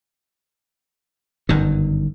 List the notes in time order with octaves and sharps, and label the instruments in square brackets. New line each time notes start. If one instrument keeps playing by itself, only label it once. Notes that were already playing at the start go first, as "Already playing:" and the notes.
[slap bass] G1 F#2 D#3